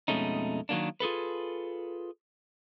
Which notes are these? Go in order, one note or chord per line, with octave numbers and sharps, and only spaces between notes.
F2 B2 G#3 A3 C#4 D#4
D#3 F#3 A#3 D4
F4 G#4 A4 B4